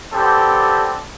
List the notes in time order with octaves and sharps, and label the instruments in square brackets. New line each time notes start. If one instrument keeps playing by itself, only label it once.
[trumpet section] B3 C4 D4 G4 A4